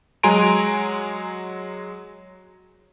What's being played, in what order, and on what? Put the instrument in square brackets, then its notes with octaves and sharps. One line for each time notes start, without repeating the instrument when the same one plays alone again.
[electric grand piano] F#3 G#3 G#5 A#5 C6 D7